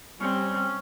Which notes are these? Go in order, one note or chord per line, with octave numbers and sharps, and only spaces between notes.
G3 C4 C#4